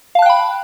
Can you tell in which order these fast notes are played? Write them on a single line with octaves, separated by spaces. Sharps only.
F5 A5 F#6 G5 B5